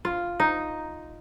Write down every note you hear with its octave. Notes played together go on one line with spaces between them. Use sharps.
F4
D#4